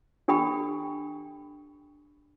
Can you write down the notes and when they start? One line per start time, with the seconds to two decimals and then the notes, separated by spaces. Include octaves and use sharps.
0.28 D4 G4 A4 G5 B5